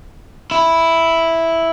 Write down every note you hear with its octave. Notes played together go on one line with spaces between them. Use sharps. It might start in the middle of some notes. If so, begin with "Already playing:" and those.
E4